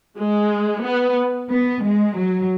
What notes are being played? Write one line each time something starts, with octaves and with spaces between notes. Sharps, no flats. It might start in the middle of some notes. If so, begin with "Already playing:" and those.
G#3
B3
B3
G#3
F#3